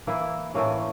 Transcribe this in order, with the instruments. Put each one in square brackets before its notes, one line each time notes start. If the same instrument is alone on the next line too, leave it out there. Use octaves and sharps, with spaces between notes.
[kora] E3 A#3 E4
A2 E3 A#3 C#4